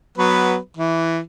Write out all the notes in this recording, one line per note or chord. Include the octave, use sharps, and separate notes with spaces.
F#3 B3 B4
E3